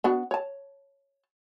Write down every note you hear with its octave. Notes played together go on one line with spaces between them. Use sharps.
B3 D4 F#4
C#5 A5